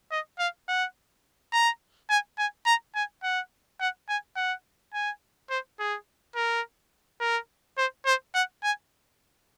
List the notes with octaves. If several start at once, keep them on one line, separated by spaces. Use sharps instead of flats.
D#5
F5
F#5
A#5
G#5
G#5
A#5
G#5
F#5
F#5
G#5
F#5
G#5
C5
G#4
A#4
A#4
C5
C5
F#5
G#5